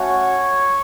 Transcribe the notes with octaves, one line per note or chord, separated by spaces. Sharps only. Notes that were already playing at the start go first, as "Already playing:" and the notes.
Already playing: A3 C#4 F#4 C#5 C#6